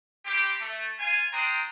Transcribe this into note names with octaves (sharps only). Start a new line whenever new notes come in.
G3 C4 G4
A3
F4 F5 G#5
D4 C5 G5 A#5 D#6